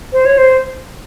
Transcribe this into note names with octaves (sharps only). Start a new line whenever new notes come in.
C5
C#5
C5